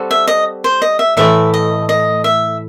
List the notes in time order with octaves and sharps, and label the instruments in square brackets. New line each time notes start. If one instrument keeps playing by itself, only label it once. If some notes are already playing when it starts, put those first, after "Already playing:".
Already playing: [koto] G3 C4 F#4 A4
[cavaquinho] E5
D#5
C5
D#5
E5
[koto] A2 E3 A3 [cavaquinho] E5
[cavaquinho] D#5
D#5
E5